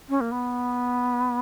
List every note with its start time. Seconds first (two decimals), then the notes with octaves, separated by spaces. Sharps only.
0.09 C#4
0.21 A#3
0.31 B3